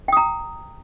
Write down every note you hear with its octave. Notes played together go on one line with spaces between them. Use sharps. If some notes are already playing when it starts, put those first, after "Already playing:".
G5 A#5 D#6